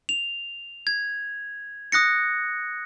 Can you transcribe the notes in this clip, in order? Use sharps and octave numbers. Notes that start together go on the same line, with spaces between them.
F7
G#6
D#6 F#6 A#6 C#7